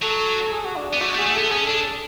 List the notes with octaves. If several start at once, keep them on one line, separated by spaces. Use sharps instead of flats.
F#3 A4
G#4
F#4
D4
B3 D4
A3 F#4
G#3
A3
G#4
A3
B3 A4
C#4 G#4
D4 A4